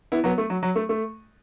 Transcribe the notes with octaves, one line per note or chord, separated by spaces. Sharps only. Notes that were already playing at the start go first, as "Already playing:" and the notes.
B3 E4
F#3 B3
A3
F#3
F#3
A3
A3